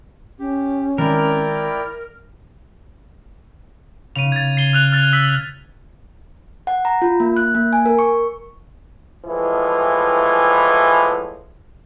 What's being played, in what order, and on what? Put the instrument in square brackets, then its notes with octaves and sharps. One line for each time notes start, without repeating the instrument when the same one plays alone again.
[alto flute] C#4 [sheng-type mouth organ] G4
[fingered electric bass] D#3 G#3 C4 [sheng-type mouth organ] E4 D5 G5 [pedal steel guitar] A#4
[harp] C#3 [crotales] D#7 F7
[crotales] G#6 A6
C7 G7
F6 F#6 F7
F6 A6
E6 B6
[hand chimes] F#5
A#5
F4
A#3
F#6
A#3
G#5
A#4
C#6
[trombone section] A2 E3 F3 G#3